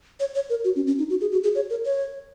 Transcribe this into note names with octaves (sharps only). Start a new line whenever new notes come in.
C#5
C#5
A#4
F#4
C#4
C#4
D#4
F#4
G#4
F#4
G#4
C#5
A#4
C#5